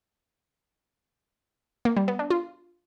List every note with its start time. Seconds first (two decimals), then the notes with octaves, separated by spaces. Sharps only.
1.85 A#3
1.97 G3
2.08 B3
2.19 D4
2.30 F4